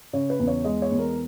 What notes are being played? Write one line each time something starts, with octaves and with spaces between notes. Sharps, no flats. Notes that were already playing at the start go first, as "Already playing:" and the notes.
C#3 C#5
B4
E2
C#5
G#3 D#5
C#5
E2
A#4